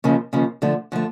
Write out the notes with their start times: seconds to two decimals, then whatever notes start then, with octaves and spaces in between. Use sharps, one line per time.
0.04 D#2 C#3 F3
0.33 D#2 C#3 F3
0.62 D3 F3 A3
0.92 D3 F3 A3